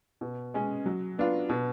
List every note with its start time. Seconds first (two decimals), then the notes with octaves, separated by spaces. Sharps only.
0.21 B2
0.54 G#3 C#4
0.86 F#3
1.18 B3 D4 F4
1.49 B2